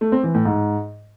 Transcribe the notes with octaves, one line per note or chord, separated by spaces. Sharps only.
A3
C4
E3
A2
G#2